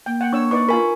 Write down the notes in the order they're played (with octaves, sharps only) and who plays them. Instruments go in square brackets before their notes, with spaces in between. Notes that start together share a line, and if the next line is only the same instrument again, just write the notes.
[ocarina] A#3 [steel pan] G5
[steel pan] F#5 G5
[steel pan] D4 C#5 E6 [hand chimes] C#6
[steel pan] D#4 B4 D5 [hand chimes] C#6
[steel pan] F4 B5 [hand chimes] A#4 G#5